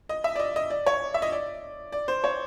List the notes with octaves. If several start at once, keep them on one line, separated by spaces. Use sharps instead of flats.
D#5
E5
D5
D#5
D#5
D5
C#5
E5
D#5
D5
D5
C5
C#5